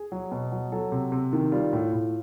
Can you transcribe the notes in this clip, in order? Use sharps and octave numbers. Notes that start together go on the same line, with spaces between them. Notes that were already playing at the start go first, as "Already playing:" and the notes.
Already playing: G#4
F#3
B2
F#3
F#3 A4
C3
C3
D#3
G3 F4
A2
A2